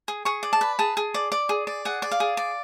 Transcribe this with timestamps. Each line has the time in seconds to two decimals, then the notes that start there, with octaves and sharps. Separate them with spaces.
0.08 G#4
0.25 G#4 C#6
0.43 D5
0.53 A5
0.61 B4
0.79 G#4 A5
0.97 G#4
1.14 D5
1.32 D5
1.49 G#4
1.67 D5
1.85 G#4 F#5
2.02 D5
2.11 F5
2.20 G#4
2.37 D5